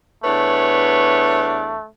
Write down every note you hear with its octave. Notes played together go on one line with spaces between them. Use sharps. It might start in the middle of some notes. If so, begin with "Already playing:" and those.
E2 A3 D4 B4 C#5